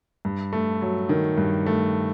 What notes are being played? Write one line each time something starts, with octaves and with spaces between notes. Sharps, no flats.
G2
A3
F#3
D#3
G2
A3